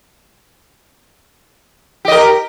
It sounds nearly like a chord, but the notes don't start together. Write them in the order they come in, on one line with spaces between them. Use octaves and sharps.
G4 D#5 A#4